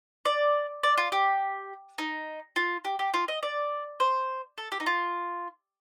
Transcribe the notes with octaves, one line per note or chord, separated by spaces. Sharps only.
D5
D5
F4
G4
D#4
F4
G4
G4
F4
D#5
D5
C5
A4
G4
D#4
F4